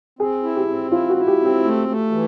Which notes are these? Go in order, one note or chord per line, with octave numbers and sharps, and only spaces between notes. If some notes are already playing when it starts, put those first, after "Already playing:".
C4 G#4
E4
G4
C4
E4 F4
F#4
E4
G4
C4
G4
A3
A3
E3